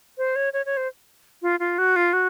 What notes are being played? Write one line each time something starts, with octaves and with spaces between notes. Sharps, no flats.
C5
C#5
C#5
C#5
C5
F4
F4
F#4
F4
F#4